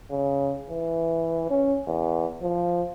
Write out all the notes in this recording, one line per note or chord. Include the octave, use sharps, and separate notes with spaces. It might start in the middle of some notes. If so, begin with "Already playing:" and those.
C#3
E3
C#4
E2
F3